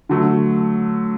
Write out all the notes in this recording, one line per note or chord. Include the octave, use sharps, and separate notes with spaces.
D3 F#3 A3